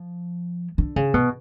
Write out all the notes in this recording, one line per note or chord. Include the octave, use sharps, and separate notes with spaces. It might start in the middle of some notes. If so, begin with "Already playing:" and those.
Already playing: F3
D3
C#3
B2